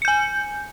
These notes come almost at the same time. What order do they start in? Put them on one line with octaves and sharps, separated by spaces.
C#7 G6 G#5